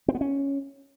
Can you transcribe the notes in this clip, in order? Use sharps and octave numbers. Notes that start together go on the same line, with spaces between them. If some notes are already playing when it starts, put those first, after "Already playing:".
C4
B3
C#4